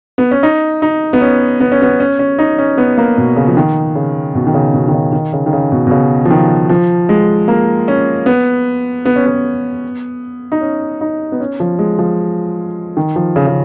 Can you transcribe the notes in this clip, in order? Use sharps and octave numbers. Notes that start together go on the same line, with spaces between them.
B3
C#4
D#4
D#4
B3
C#4
B3
C#4
B3
C#4
C#4
D#4
C#4
B3
A#3
B2
C#3
F3
D#3
C#3
B2
D#3
C#3
B2
D#3
C#3
D#3
C#3
D#3
C#3
B2
B2
C#3
F3
D#3
F3
G#3
A#3
C#4
B3
B3
C#4
B3
D#4
C#4
D#4
B3
C#4
F3
G#3
F3
D#3
F3
C#3
C#3